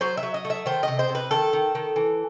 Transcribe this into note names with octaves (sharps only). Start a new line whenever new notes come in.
F#3 C5
E5
F#3
D#5
A3
E5
D#3 C5
C3 D#5
C5
C3
B4
D#3 A4
D#3
D#3
E3